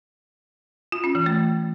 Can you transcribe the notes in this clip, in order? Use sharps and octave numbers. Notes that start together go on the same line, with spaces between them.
F4
C#4
E3
A3